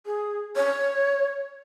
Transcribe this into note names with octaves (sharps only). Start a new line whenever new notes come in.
G#4
C#5